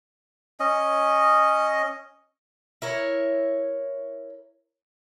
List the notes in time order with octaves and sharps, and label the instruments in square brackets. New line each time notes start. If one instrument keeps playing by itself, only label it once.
[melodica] C#4 D#5
[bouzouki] E4 A#4 C#5